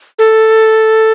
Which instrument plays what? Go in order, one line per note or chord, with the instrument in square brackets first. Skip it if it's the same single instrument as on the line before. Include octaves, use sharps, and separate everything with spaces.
[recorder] A4